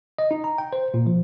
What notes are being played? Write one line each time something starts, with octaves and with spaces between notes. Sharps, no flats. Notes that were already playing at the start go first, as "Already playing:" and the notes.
D#5
D#4
A#5
G5
C5
A#2
F3